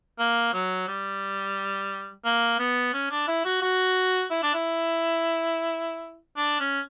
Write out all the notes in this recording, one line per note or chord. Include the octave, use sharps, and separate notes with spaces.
A#3
F#3
G3
A#3
B3
C#4
D4
E4
F#4
F#4
E4
D4
E4
D4
C#4